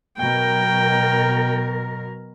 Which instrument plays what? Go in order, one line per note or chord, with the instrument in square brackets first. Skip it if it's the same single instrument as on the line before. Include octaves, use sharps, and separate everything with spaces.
[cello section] B2 F#3 A#4 [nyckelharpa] G5